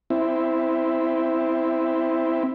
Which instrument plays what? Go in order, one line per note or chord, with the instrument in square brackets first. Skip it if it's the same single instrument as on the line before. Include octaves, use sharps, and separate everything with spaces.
[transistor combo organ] C4 E4